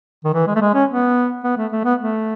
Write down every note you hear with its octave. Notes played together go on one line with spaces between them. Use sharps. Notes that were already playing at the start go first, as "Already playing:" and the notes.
D#3
E3
G#3
A3
G#3
C#4
B3
B3
A3
A3
B3
A3